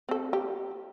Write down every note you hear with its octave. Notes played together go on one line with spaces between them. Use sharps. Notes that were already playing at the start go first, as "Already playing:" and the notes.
C4 A4
G4